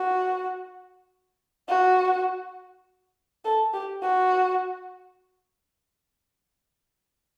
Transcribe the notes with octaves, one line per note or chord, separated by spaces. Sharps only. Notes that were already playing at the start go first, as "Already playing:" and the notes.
Already playing: F#4
F#4
A4
G4
F#4